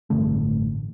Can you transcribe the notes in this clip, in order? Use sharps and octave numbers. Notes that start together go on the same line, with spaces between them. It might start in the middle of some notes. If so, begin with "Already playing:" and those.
A1 G2 D3 A3